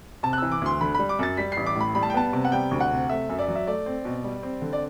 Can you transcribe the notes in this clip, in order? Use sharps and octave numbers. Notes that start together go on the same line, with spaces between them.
C3 A5
F#6
E3 E6
D6
D2 C6
D3 B5
G3 B5
D6
F#2 A6
G3 B6
A1 C7
D6
A2 B5
G3 B5
A5
G5
B3 A5
C3
F#5
G3 G5
D2
F#5
C3
A3 E5
F#2
D5
F#3
E5
A3 D5
C4
B2
G3
C4
D3
D5